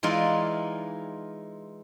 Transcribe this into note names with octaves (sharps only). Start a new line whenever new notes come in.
E3 G#3 D#4 F4 D5